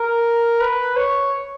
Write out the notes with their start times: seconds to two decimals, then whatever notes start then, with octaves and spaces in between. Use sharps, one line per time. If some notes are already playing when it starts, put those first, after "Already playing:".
Already playing: A#4
0.61 B4
0.96 C#5